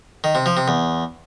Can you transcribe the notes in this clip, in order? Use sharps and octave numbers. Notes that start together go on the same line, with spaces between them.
D#3
C3
F3
C3
E2